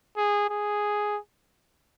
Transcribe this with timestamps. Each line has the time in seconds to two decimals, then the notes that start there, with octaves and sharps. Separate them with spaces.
0.17 G#4
0.50 G#4